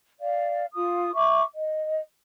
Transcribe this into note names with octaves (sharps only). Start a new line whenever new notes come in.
D5 F5
F4 D#6
E5 C#6 D6
D#5